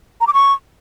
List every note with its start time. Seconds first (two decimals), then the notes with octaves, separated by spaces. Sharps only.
0.21 A#5
0.27 D6
0.34 C#6